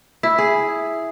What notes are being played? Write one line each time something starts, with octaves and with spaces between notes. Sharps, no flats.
E4
G#4